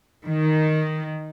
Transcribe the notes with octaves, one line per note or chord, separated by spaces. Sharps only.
D#3